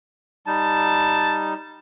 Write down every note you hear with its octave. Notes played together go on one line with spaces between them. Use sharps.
G3 D#4 A5